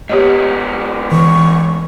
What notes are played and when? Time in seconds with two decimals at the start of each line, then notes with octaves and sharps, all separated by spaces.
0.09 G#2 B3 G4 C#5 D#5
1.12 E3 C#6